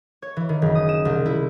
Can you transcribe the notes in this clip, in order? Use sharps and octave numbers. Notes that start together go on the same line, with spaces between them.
C#5
E3
D#3
F#1
D#6
E7
C2
E4